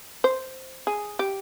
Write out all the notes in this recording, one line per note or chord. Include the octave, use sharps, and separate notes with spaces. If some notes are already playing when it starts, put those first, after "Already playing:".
C5
G#4
G4